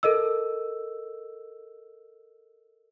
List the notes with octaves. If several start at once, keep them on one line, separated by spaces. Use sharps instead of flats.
A4 A#4 D#5 E6